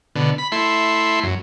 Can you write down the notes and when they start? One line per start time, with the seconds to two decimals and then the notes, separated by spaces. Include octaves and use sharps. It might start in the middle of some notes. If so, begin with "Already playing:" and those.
0.15 B2 D3
0.38 B5
0.52 A3 E4 C6
1.23 F#2